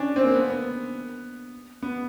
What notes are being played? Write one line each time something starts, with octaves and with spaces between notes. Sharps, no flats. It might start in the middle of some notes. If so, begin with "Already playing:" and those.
Already playing: C#4 D4
C4
A#3
B3
B3
B3